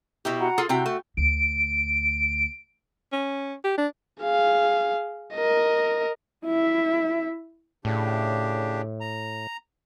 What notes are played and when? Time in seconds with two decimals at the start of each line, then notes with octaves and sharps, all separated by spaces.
0.25 B2 E4 G4
0.40 F#4 F#5 A#5
0.58 F4 G#4 A4
0.69 C3 E4 F#4 G5
0.86 A3
1.17 D2 D7
3.12 C#4
3.64 G4
3.78 D4
4.23 G#4 F5
5.34 A#4 D#5
6.45 E4 E5
7.85 A2 C#3 D4 G4
9.01 A#5